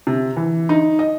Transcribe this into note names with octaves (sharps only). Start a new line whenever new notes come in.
C3
E3
D#4
D#5